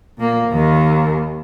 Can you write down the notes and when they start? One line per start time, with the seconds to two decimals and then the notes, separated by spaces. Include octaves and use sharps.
0.18 A#2 A#3
0.49 D#2 D#3